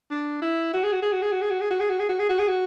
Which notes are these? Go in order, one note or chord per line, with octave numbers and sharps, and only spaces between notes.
D4
E4
F#4
G#4
F#4
G#4
F#4
G#4
F#4
G#4
F#4
G#4
F#4
G#4
F#4
G#4
F#4
G#4
F#4
G#4
F#4